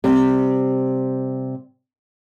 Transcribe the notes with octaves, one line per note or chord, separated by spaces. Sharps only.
C3 G3